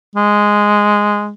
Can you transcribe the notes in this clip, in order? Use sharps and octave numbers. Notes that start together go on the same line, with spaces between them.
G#3